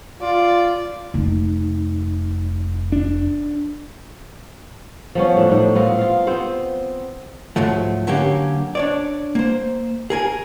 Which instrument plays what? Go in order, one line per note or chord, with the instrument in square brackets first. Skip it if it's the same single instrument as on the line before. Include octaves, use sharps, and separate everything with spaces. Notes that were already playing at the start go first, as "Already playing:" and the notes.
[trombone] F4 [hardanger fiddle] D5
[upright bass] F1 D#4
[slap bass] D4
[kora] F3 B3 C#4
A2 D4
A2 D#4
B3 C4 F4 A#4
F4 F5
B3 C4 C5
[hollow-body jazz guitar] C2 G#2 F3 F#3 A3
D3 F#3 A#3 C#4 G4
D4 C#5 D5
A#3 C5
G#4 A#4 G#5